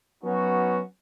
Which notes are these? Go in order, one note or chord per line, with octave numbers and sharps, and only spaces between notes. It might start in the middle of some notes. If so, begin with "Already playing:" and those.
F#3 B3 C#4 D#4 F#4